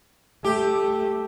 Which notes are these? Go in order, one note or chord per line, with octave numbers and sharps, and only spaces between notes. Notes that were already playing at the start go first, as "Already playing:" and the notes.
A3 G4